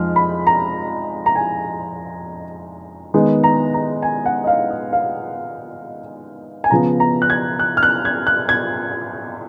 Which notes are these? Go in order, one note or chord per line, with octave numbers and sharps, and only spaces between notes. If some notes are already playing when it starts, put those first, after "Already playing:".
Already playing: F2 F3 G#3 D#4 F6
B5
A#5
A#5
G#5
D#3 G#3 B3 D#4
A#5
A#5
G#5
F#5
D#5
F5
D#5
F5
G#5
C#3 F3 B3 A#5
A#5
F#6
G#6
F#6
F6
F#6
G#6
F#6
G#6